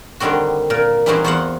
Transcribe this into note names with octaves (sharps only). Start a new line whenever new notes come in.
D3 D#3 G3 C4 F#4
A#2 A#4
E3 G3 C4 D#4 F#4 G#4
E2 F#4 C5 F5 F#5